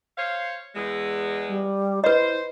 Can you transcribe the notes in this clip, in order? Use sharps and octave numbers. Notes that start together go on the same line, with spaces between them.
C5 C#5 F5
E2 G#3
G3
E4 B4 C5 D#5